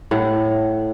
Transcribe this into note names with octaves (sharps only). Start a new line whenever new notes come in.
A2 F#5